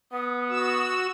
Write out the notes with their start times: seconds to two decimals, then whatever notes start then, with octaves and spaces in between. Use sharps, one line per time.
0.12 B3 D#6
0.50 F#4 E6